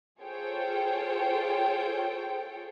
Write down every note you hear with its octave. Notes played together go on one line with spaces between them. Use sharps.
F4 G#4 A4 C5 C#5 G5